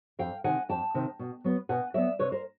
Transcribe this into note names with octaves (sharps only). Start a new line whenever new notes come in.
F2 F5 G5
C3 D#3 F#5 G#5
F2 G5 A5
C3 D#3
B2
F#3 B3
B2 F#5 G#5
F#3 B3 D5 E5
C3 B4 C#5
A#4 C5